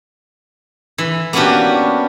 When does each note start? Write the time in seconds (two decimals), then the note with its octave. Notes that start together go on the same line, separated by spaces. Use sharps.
0.98 E3
1.33 A#3 B3 C#4 D4 F#4 G4